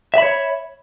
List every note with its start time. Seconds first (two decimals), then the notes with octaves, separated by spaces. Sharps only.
0.14 E5
0.18 B5
0.22 C#5